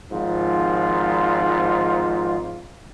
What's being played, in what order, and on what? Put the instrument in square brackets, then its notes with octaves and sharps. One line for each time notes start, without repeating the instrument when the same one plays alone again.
[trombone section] G#1 G#2 F3 F4